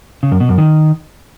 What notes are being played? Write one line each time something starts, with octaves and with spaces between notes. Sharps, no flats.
C#3
F#2
B2
F#2
D#3